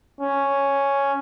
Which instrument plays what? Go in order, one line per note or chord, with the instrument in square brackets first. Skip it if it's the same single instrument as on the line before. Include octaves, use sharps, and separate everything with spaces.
[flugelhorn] C#4